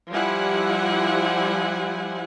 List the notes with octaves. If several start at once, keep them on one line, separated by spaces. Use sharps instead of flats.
F3 G3 E4 F#5 G#5